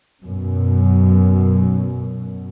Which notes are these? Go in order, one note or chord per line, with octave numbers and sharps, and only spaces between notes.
F#2 B2